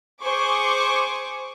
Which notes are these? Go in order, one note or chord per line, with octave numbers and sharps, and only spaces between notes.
G#4 C5 C#6 D6